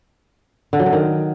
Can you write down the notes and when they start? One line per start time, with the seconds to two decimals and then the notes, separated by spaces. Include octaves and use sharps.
0.73 D3
0.79 F#3
0.86 D3
0.93 D#3